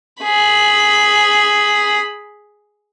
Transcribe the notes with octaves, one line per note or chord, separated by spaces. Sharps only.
G#4 B5